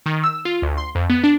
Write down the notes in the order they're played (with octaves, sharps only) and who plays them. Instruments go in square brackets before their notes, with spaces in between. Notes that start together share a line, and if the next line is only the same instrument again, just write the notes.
[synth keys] D#3
E6
F4
D2
C6
F2
B3
D4